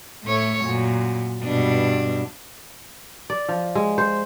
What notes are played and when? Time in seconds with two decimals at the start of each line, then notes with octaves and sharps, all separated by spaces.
0.24 A2 A3 C#5
0.64 F#2 A#2
1.43 G2 B2 D4
3.30 D5
3.49 F3
3.75 G#3
3.98 C5